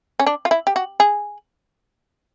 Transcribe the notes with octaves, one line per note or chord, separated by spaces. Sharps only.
C#4
D4
F4
E4
G4
F#4
G#4